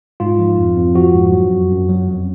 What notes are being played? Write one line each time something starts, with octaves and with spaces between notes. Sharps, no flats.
G#2 F4
F3
F2
F2
F3 F#4
G#2
F#3
F#2
F#2
F#3
F2